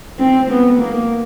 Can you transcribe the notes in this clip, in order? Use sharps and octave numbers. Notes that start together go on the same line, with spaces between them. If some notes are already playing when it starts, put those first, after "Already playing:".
C4
B3
A#3